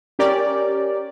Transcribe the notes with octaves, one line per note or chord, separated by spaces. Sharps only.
C#4 G4 A#4 D5